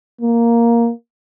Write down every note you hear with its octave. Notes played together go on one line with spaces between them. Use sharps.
A#3